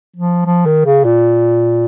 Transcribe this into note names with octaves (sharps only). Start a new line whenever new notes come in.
F3
F3
D#3
C#3
A#2